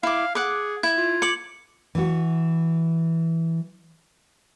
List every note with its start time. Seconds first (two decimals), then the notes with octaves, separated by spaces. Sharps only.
0.03 E4 F5 D6
0.35 G#4 F#5 D6
0.83 E4 G#6
0.98 F4
1.22 D6 C#7 F#7
1.95 E3 F#4